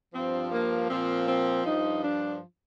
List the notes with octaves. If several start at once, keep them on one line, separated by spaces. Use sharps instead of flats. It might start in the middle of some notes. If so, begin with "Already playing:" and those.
G2 F3 C4
A#3
A#2 F3 C4
C4
G2 F3 D#4
D4